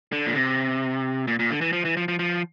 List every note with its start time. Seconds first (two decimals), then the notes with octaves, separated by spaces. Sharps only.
0.12 D3
0.26 A#2
0.35 C3
1.28 A#2
1.39 A#2
1.51 D3
1.61 E3
1.73 F3
1.85 E3
1.97 F3
2.08 F3
2.19 F3